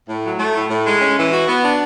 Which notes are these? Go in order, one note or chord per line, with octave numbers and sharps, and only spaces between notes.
A2
F#3
A3
A2
A2
G#3
C#4
E3
F#4
B3
D4